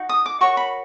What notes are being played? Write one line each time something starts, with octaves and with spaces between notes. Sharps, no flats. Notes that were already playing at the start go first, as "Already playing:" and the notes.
Already playing: D#4 F#4
D#6
D6
F#4 A#4 C#5 C#6
B5